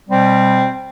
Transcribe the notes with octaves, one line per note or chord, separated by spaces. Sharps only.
B2 G3 C4